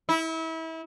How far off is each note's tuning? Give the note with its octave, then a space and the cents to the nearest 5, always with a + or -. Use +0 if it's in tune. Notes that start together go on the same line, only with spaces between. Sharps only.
E4 -30